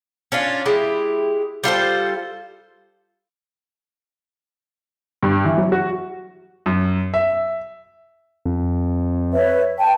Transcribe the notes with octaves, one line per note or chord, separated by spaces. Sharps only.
C#4 D4 F4
G#3 E4 G4
G3 F4 A4 C5
G2
E3
F#3
F#4
F#2
E5
F2
B4 C#5 E5
G5 A5